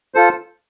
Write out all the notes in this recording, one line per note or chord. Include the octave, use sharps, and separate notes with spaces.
F4 A4 C5